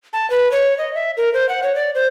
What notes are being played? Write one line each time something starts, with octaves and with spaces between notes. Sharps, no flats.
A5
B4
C#5
D#5
E5
A#4
C5
F#5
C#5
D5
C5